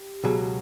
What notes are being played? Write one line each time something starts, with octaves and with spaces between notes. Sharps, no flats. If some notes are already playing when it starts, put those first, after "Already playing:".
Already playing: G4
C#2 B2 F#3 F#4 G#4